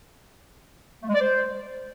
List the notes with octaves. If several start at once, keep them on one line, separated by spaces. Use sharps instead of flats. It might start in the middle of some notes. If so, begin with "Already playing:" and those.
A3
G#3
D5
C5